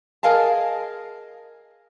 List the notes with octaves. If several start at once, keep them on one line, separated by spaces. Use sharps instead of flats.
G#4 A#4 D#5 F5 G#5 A5